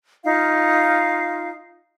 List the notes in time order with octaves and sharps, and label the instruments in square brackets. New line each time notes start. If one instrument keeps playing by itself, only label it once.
[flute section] D#4 F4 F5